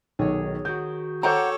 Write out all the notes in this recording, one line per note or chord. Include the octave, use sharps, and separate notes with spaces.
B1 D#3 G#4 C#5
D#3 F#4 G6
A4 C5 C#5 F#5 G5 A#5 C#6 D6